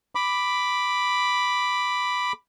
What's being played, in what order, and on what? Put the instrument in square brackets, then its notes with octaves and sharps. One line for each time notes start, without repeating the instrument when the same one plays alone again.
[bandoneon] B5 D6